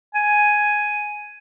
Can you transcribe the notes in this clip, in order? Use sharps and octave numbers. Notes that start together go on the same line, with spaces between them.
G#5